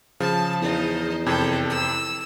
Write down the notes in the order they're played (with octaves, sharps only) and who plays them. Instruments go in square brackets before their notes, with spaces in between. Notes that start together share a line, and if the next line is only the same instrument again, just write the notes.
[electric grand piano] C#3 F3 [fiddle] A5
[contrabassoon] E2 [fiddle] D#4 C5
[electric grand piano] F2 C3 G#6 [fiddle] A4 G5
[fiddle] E6